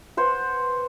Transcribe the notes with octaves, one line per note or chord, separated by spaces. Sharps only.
B4 C5 F#5